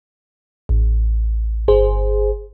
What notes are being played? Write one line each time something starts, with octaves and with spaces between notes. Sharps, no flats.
A1
G1 G#4 C5